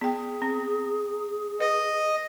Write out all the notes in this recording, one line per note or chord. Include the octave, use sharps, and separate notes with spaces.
B3 G#4 G5
C4
B4 D#5